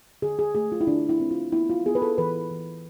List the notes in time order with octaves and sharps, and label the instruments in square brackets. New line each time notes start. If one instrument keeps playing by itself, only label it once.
[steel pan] D3 G#4
G#4
A3 G#4
F4
E4
D3 D4
E4
C4
F4
B3 E4
F4
B3 G#4
B4
A4
E3 B4
E3